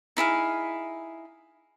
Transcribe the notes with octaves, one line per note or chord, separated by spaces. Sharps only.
D#4 E4 G#4 F5